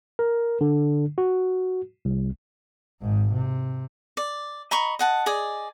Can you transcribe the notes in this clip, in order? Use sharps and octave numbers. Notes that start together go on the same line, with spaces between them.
A#4
D3
F#4
C2
G#1 G#2
C3
D5
D#5 A#5 B5 C#6
D#5 F#5 A5
G#4 D5 D#5